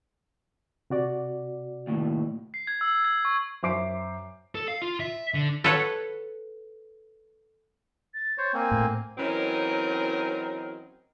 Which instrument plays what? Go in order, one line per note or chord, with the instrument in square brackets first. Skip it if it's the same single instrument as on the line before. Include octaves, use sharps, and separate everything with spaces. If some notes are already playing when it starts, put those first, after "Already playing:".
[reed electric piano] C3 F#4 D5
[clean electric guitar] D#2 A2
[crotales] C7
G#6
E6
G#6
C#6
[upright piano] F#2 C5 E5 D6 C7 D7
[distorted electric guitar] A4
F5
F4
E5
D3
[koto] A4 B4 C#5 F#5
[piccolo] A6
[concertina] C5 C#5
[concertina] A#3 C4 [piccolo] G#5
[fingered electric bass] A2
[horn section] E3 F#3 C4 C#4 D#4 A#4